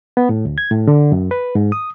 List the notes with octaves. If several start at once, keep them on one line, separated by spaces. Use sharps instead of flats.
B3
A2
D2
G#6
A2
D3
F#2
B4
G#2
D#6